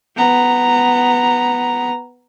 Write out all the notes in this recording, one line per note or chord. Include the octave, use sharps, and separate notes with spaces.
B3 A#5